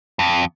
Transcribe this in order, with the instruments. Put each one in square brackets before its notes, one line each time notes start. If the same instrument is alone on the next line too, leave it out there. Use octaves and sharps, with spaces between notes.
[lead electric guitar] F2